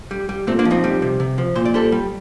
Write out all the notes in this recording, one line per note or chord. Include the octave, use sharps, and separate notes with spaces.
G3
G3
A#2 A3 C4
A#3 D4
F3
C4 D#4
G3
C3
C3
F3
A#2 C5
D5
G3 A4 C5
G3